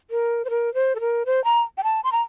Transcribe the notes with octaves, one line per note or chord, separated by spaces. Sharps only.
A#4
C5
A#4
C5
A4
A#4
C5
A#5
G5
A5
C6
A#5